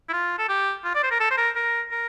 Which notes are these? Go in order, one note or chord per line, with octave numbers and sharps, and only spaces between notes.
E4
F4
A4
G4
F4
D5
C5
A#4
A4
C5
A#4
A#4
A#4